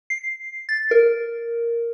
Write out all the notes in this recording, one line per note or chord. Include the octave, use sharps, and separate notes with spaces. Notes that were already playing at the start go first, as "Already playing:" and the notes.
C7
A6
A#4